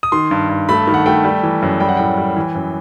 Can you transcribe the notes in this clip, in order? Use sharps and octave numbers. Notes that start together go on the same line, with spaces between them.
D#6
D#3 C6
G2
G2
A3 B5
D#3
F#5
A3 G5
G3
E3
F#2
G3 G5
F#5
A2 G5
G3
E3
F#2